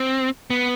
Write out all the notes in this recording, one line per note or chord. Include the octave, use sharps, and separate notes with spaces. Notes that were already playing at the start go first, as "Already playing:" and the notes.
Already playing: C4
B3